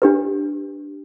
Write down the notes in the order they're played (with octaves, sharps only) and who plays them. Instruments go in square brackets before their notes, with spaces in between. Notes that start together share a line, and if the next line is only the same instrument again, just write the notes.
[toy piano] D4 G4 B4